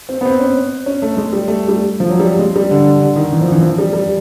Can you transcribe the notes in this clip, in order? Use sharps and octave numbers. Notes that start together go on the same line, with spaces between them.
C4
B3
C4
C#4
C#4
A3
G#3
G3
A3
G3
F3
F#3
G3
G#3
G3
D3
D3
D#3
E3
F3
E3
F3
G3
G3